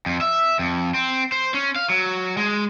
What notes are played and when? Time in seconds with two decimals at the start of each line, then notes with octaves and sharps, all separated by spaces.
0.06 F2
0.21 E5
0.59 F2
0.94 C4
1.32 C5
1.54 C#4
1.76 F5
1.90 F#3
2.37 G#3